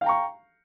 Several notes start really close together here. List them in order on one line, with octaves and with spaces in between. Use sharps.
F5 G5 A#5 C#6